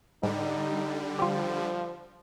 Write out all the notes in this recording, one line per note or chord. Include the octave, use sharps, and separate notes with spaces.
G#2 D3 G3 D#4
F3 F4 G4